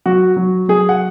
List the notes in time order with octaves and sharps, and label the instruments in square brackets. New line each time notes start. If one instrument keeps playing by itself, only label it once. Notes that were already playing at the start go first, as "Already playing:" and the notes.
[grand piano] F#3 F#4
F#3
F#3 G#4
F#5